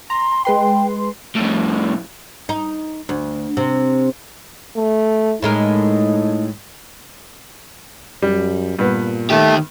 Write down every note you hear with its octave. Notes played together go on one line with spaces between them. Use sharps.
A#5 C6
G#3 B4 G5 C6
F2 A2
D#4
D2
C3
A3
A2 G#3 D#4 A#4
F#2 G3
G2 A#2 B3
D#3 A3 G4